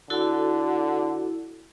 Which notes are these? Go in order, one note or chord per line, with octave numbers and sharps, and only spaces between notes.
D3 E4 F#4 A4